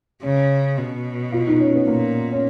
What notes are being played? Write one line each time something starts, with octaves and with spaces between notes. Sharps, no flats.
C#3 C#4
B2
F4
D#4
C#4
B3
A#2 A#3
C#4